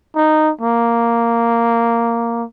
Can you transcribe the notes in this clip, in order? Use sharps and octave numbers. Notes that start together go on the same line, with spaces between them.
D#4
A#3